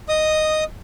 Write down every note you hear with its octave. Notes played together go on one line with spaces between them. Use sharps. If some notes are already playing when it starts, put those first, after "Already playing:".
D#5 D#6